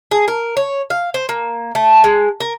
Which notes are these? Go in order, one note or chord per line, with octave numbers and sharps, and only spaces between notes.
G#4
A#4
C#5
F5
C5
A#3
A3
G#3
A#4